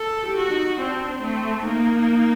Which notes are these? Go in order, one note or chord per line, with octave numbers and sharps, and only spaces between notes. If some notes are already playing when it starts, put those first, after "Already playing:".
Already playing: A4
G4
F#4
D#4
C4 D4
A3 C4
A#3 D#4